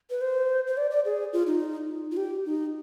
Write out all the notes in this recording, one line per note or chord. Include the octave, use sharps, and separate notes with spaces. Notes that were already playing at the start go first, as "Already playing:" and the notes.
B4
C5
C5
D5
D5
G#4
F4
D#4
F4
G4
D#4